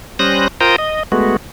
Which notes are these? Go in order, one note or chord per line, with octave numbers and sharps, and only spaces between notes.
G3 C#4 C5 D#6 F#6 A#6
F4 A#4 C5 G5 A#5 D#6
D#5
G#3 A3 B3 F#4